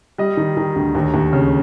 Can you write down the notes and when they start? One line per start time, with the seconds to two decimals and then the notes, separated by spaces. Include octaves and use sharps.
0.18 G3 D#5
0.37 D#3
0.57 D#3
0.76 D2
0.95 D#2
1.14 D#2
1.33 C#3